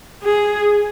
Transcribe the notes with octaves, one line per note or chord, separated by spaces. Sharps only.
G#4